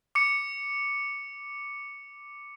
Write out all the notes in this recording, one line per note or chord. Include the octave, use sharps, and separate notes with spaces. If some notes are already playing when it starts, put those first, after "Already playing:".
D6 C#7